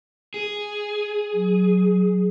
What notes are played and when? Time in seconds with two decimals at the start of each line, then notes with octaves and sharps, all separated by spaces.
0.34 G#4
1.34 F#3